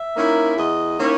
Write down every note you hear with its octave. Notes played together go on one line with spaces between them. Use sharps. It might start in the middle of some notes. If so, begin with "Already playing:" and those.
Already playing: E5
D#3 A#3 C#4 E4
E2 D#5
D#3 A#3 C#4 E4 C#5